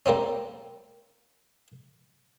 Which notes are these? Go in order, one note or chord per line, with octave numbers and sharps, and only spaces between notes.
G3 A#3 C4 C#4